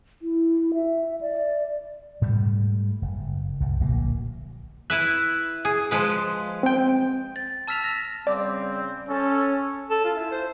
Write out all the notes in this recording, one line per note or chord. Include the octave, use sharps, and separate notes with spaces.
E4
E5
D5
G#2 G3 A3
F#1
C2
D1 A#1 F#3 A#3
E4 B4 E5 F#6
G#4
F3 G#3 B4
C4 G5
A6
A5 E6 F6 B6 E7 F7
A#6
C#3 G3 C4 D5
C#4 A4
A4
F4
E4
C5